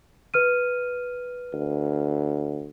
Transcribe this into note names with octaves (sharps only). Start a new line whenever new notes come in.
B4 F6 D#7
D2